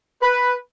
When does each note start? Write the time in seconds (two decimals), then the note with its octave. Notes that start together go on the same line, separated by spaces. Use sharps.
0.22 B4